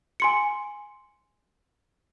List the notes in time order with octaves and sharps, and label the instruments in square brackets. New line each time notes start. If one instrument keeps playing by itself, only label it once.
[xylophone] G#5 C6 C#7